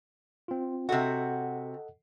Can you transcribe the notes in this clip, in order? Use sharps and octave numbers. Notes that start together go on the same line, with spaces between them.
C4 F4
C3 F#4 A4 D#5 F#5